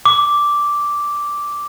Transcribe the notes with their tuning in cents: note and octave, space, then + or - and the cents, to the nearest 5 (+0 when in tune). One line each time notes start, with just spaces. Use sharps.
D6 -5